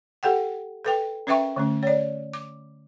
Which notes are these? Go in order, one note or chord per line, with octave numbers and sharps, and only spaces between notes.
G4 A4 F#5 G5
A4 B4 G5
C#4 A#4 B4 E5 G5 C#6
D3 A3 C#4
C#5 D5
D6